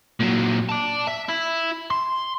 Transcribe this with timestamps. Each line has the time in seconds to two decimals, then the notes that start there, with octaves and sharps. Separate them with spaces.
0.20 A#2 F#3
0.69 D5 A5
1.07 E5
1.29 E4
1.90 C6